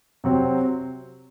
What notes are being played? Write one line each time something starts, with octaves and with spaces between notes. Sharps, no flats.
C3 F#3 C4